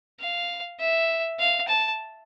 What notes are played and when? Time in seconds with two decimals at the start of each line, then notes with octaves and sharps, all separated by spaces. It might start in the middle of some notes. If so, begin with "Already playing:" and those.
0.20 F5
0.80 E5
1.39 F5
1.68 A5